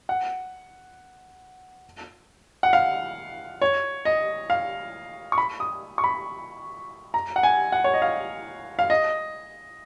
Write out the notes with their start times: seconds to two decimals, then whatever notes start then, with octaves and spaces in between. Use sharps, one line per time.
0.09 F#5
2.63 F#5
2.73 F5
3.62 C#5
4.05 D#5
4.50 F5
5.32 C#6
5.38 B5
5.60 D#6
5.98 C#6
6.04 B5
7.14 A#5
7.36 F#5
7.43 G#5
7.72 F#5
7.84 C#5
7.94 D#5
8.02 F5
8.79 F5
8.90 D#5